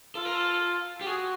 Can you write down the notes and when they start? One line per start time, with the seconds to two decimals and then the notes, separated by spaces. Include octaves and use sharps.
0.15 F4 A4
0.25 A#4
0.35 A4
1.01 G4
1.06 F#4 G#4